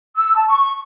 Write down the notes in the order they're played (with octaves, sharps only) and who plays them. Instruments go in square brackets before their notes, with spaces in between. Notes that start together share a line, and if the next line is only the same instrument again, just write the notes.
[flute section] E6
A5
C#6